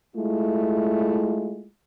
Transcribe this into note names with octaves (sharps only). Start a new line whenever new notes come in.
G#3 A3 E4 F4